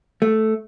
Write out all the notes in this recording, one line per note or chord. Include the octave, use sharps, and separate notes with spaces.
A3